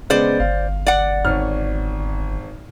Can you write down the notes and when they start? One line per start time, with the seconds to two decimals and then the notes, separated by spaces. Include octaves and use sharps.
0.10 C#3 G#3 B3 C5 D5
0.40 G1 F5
0.87 D5 F#5
1.25 G#1 C#5 F6